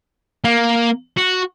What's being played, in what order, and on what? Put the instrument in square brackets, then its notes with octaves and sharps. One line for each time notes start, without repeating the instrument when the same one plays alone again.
[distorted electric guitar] A#3
F#4